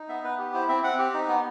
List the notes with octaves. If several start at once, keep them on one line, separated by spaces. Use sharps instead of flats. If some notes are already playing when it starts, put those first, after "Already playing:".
Already playing: D#4
B3 E5
B3 B4
G4
E4 C5
C4 E5
C4 F#5
G4
D#4
B3